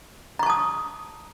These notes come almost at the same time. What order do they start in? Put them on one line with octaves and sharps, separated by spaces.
A#5 C#6 A5 D#6